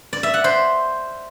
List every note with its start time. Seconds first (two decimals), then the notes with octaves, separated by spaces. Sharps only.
0.13 D5
0.23 E5
0.34 F#5
0.44 C5